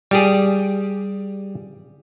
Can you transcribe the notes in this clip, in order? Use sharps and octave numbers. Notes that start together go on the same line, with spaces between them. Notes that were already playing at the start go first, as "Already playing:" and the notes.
G3 G4 G#4